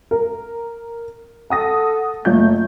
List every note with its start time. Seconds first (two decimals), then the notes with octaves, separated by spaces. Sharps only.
0.11 A#4
1.50 A4 F#5 D#6 A#6
2.25 F#1 A3 F4 G6